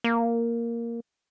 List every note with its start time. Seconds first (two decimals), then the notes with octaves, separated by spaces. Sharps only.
0.04 A#3